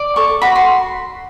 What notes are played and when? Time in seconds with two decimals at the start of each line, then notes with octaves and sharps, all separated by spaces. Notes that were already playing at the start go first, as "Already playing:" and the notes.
Already playing: D5
0.16 A4 C#6
0.42 F#4 B5
0.55 C6